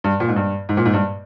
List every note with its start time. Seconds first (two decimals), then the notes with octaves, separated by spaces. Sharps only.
0.04 G2
0.20 A#2
0.28 G#2
0.36 G2
0.69 G#2
0.77 A#2
0.86 G#2
0.93 G2